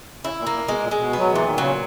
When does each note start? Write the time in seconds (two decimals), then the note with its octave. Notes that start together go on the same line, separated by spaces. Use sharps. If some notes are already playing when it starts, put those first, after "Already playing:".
0.24 C#3 E4
0.40 A#2
0.47 A#3
0.54 A#2
0.68 B2 G#3
0.83 A#2
0.91 G#3
0.98 B2
1.13 B3
1.18 F#3
1.32 A#2 E3
1.45 D#3
1.58 C#3 F#3